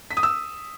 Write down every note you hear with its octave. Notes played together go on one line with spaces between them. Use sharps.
B6
D#6
E6